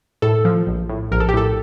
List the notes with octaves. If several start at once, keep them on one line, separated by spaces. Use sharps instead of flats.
A2 A4
F3
A#1
A2
A#1 A#4
A4
G4
A2 A4